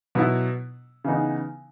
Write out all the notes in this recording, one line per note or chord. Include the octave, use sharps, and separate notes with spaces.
B2 F#3 B3 E4
C#3 E3 B3 D#4